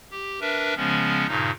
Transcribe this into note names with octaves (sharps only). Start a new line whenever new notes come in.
G4
D4 A#4 B4 E5
C#3 F3 G#3 B3 C#4
G2 A#2 C#3 D#4